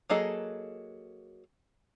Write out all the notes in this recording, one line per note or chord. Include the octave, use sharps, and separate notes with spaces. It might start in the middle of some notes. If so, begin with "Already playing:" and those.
F#3 A#3 G#4 A4 D#5